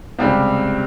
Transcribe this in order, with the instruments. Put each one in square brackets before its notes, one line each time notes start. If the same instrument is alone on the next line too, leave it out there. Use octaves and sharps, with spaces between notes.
[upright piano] C#2 C3 G3 C4